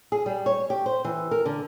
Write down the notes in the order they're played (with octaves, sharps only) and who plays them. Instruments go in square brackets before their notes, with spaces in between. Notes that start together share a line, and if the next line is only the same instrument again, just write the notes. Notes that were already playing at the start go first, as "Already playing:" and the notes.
[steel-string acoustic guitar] G#4
G3
C#5
G4
C5
E3
A#4
D3